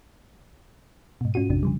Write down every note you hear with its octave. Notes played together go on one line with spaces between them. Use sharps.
G#2 B2
G#2 C#4 F4 F#4 D#7
A1 F2 C3 D4
C#3 F3 G3